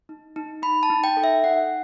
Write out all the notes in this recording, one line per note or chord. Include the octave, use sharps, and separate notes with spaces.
D#4
D#4
D#4 B5
A5
D#4
G5
A4
E5
D#4 F#5